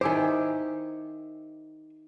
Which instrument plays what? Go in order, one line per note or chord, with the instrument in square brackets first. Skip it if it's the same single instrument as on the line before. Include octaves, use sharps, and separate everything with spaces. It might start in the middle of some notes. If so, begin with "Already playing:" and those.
[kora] D#3 E4 G4 [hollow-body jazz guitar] C5 G#5